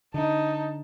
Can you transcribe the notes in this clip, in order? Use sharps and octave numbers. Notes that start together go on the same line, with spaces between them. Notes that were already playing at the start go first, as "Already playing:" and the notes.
D3 D#4 A5